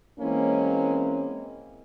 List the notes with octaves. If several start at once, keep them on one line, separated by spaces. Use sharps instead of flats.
E3 G#3 A#3 C4 C#4 E4